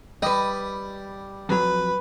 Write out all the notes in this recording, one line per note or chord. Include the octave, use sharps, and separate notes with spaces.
G3 B4 D#5
F2 F#3 B4